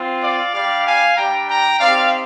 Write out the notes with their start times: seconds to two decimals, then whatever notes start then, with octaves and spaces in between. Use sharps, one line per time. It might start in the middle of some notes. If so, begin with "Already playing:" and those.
Already playing: C4 F4
0.21 D5 F5
0.53 G3 D4 G4 D5 F5
0.85 F5 G#5
1.16 G3 D4 G4 G5 A#5
1.48 G5 A#5
1.80 C4 D#4 G4 D5 F5